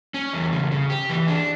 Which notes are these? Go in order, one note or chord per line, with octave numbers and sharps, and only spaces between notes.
C#4
E2
C#3
C#3
G4
E3
D4